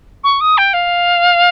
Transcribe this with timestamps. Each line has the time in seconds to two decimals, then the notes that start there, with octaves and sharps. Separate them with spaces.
0.24 C#6
0.41 D#6
0.58 G5
0.73 F5